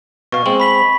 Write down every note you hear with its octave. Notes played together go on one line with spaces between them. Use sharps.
B2 F5 C#6
G#3 C4 F#7
B5 B6 F#7